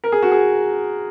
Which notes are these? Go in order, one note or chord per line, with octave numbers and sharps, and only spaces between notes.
A#4
G#4
F#4
G#4